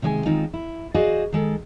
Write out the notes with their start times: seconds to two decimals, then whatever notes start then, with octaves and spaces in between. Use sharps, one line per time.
0.02 C3 D#3 G#3 C#5 G#5
0.25 D#3 G#3 C4 D#4 F4
0.54 E4
0.94 F#4 G#4 C5 D5 D#5 F5
1.32 D#3 G#3 A4